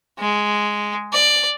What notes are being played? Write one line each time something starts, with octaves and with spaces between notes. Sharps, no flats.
G#3
D5